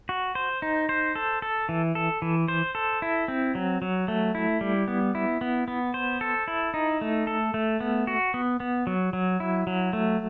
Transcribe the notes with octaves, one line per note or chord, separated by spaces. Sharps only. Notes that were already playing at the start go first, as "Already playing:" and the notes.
F#4
C5
D#4
C5
A4
A4
E3
A4
E3
C5
A4
E4
C4
F#3
F#3
A3
E4
G3
B3
E4
B3
B3
C5
A4
E4
D#4
A3
A4
A3
B3
F#4
B3
B3
F#3
F#3
E4
F#3
A3